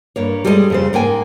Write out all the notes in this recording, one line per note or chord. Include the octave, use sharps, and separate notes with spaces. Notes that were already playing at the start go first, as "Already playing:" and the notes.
G2 A#3 C#5
G3 G#3 A4 A#4 D#5
F2 C#3 C5
G#2 A#3 G5 G#5